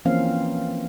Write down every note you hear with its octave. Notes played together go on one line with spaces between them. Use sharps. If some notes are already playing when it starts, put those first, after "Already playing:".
E3 F3 A#3 C4 C#4 F5